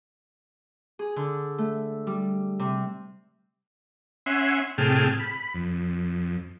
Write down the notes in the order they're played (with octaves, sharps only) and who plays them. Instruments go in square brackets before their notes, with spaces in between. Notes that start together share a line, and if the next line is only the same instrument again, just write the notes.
[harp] G#4
D3
A3
G3
C3
[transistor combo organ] C#4 E5 F#5 G#5 C6
A2 C3 G#4 G5 A5 F6
B5
F2